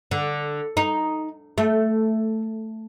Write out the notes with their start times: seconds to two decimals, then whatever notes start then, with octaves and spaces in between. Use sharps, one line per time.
0.11 D3
0.77 D#4
1.58 A3